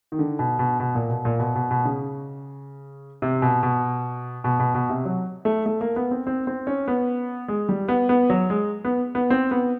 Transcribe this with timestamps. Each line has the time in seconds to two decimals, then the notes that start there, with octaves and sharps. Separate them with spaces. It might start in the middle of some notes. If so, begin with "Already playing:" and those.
0.12 D#3
0.19 D3
0.39 B2
0.59 B2
0.80 B2
0.95 A#2
1.09 B2
1.25 A#2
1.39 B2
1.55 B2
1.71 B2
1.85 C#3
3.22 C3
3.42 B2
3.63 B2
4.44 B2
4.59 B2
4.75 B2
4.90 C3
5.05 F#3
5.45 A3
5.66 A3
5.81 A#3
5.96 B3
6.11 C4
6.27 C4
6.47 C4
6.67 C#4
6.88 B3
7.48 G#3
7.69 G3
7.88 B3
8.09 B3
8.30 F#3
8.50 G#3
8.85 B3
9.15 B3
9.30 C4
9.51 B3